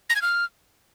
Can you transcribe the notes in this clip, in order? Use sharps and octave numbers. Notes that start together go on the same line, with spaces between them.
A#6
G#6
F6